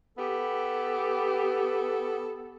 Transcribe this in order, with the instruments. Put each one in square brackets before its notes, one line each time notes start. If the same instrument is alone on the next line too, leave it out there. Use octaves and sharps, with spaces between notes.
[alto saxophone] B3 [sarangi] G4 [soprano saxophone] A4